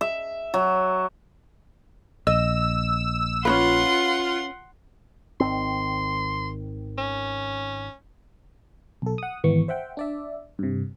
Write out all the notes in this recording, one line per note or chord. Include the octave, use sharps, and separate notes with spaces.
E5
F#3
A#1 D#5 E6
C#4 D#4 F4 B4 F#5 C6
G#1 D#3 C4 C6
C#4
B1 A4
F#5 D#6
G#1 E3 B3 C#6
C5 E5 F#5 G5
D4 D5 E5
G2 C3